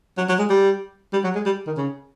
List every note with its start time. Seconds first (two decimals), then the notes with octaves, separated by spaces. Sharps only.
0.18 F#3
0.29 F#3
0.39 G#3
0.50 G3
1.13 G3
1.24 F#3
1.35 G#3
1.45 G3
1.67 D#3
1.77 C#3